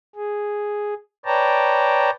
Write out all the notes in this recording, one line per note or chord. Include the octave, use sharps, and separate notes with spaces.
G#4
B4 C#5 D5 G5 A5 A#5